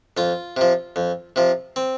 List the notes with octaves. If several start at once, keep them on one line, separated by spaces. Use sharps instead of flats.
F2 F4
C3 F3
F2
C3 F3
C4